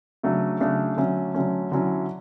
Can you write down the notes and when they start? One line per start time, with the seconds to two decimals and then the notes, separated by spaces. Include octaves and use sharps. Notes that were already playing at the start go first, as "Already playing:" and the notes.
0.23 C#3 F#3 A3 D4
0.60 C#3 F#3 A3 D4
0.97 D3 F#3 A3 C#4
1.34 D3 F#3 A3 C#4
1.72 D3 F#3 C#4 E4